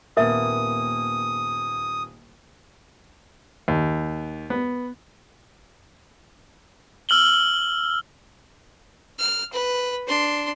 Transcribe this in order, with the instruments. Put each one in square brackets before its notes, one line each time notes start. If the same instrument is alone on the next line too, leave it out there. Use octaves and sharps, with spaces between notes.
[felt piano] D#1 A#3 B3 [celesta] A#4 E5 [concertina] D#6
[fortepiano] D#2
B3
[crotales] E6 F6 F#7 G7
[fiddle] F6
B4
D4 C6